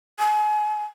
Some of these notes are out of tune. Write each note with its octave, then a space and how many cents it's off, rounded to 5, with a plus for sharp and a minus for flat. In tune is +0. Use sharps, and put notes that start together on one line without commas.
G#5 +35